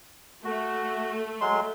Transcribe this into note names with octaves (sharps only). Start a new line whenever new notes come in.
A3 F#4
F#3 G#3 C6